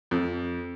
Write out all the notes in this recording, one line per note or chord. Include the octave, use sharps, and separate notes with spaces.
F2